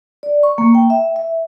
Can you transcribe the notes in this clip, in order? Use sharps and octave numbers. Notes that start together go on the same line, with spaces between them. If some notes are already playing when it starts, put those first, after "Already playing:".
D5
C#6
A#3
G5
E5
E5